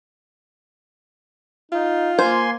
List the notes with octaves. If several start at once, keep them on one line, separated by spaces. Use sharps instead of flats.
D#4 F4
A#3 C5 G#5 C6